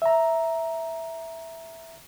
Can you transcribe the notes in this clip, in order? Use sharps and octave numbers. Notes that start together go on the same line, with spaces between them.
E5 A#5